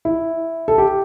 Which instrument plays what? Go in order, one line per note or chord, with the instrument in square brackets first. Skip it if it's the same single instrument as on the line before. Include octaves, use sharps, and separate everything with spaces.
[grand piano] E4
A4
G4